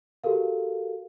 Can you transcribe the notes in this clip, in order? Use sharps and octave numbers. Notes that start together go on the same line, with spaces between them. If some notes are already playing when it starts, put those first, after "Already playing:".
F#4 G4 A4 A#4 F5